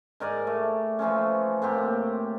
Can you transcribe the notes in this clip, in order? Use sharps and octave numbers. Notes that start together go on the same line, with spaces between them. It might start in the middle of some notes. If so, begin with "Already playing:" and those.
G#2 A#4 D5 G#5
A3
E3 F3 A3 C#4
A2 A#3 C4 G4